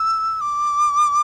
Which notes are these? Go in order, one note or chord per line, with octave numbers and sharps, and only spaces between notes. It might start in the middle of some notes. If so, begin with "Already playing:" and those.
Already playing: E6
D6